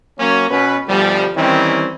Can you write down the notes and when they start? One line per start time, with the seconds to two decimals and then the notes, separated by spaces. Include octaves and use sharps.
0.19 F#3 A#3 C#4
0.51 B2 C#4 B4
0.88 D2 B2 F3 G3
1.36 D#3 E3 G3 C4 C#4 E4